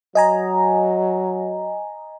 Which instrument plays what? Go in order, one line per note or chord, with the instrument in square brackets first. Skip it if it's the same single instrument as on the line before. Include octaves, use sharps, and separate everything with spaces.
[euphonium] F#3 [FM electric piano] D#5 G#5 A#5